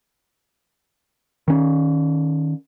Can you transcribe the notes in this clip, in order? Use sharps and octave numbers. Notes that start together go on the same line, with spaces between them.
D#3 C#4